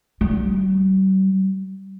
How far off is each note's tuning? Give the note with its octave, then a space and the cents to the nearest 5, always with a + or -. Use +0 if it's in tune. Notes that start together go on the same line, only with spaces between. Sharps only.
G3 -45